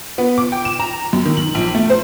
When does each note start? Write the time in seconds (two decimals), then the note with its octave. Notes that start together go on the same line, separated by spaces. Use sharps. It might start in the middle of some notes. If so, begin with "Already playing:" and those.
0.18 B3
0.38 D6
0.52 G5
0.65 E7
0.80 A#5
1.13 F#2
1.25 D#3
1.37 F#7
1.55 A#1
1.75 A3
1.90 C5